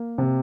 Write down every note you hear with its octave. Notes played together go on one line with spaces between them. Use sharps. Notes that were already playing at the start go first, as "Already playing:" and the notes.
Already playing: A#3
C3